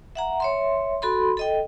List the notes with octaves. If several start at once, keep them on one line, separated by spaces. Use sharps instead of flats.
E5 F#5 A#5
C#5 E5 C6
F#4 A4 B5 C6
A4 D#5 G5